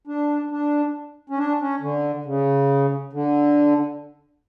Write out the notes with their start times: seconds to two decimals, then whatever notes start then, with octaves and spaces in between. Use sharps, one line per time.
0.07 D4
0.51 D4
1.30 C#4
1.38 D4
1.60 C#4
1.81 D3
2.25 C#3
3.13 D3